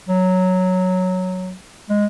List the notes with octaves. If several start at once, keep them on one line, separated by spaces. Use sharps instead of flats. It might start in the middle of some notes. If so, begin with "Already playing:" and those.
F#3
G#3